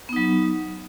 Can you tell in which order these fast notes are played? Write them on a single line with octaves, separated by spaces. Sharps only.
B3 D#4 F#3